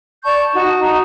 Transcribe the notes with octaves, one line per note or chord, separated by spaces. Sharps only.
D5 A5 C#6 G6
D#4 F#4 A5
D#4 F#4 A#5